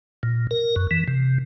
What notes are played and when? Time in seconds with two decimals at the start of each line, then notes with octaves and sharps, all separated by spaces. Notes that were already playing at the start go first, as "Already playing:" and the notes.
0.23 A#2
0.51 A#4
0.76 F#2
0.91 E3
1.08 C3